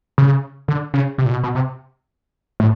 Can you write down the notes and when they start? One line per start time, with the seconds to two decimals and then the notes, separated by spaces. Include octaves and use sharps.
0.18 C#3
0.68 D3
0.94 C#3
1.18 C3
1.26 A#2
1.31 B2
1.44 B2
1.55 C3
2.60 A2